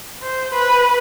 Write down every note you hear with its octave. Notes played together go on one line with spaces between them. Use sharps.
C5
B4